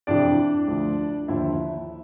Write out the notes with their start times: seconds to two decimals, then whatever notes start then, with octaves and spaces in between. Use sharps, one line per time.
0.07 F2 C3 E3 D4 D5
0.68 D2 D3 F3
1.28 D#2 D3 F3 E4 E5